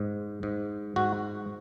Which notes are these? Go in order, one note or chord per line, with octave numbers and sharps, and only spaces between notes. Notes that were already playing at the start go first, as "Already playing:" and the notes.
Already playing: G#2
G#2
G#2 F#4